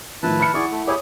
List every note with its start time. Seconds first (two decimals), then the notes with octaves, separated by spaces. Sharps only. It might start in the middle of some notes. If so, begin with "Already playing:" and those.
0.23 A2 D#3 F3 E4 B4 A5
0.39 B5 F6 C#7
0.54 E4 G#4 D5 F#5 C#6
0.71 A3
0.87 E4 G4 G#4 C#5 D#6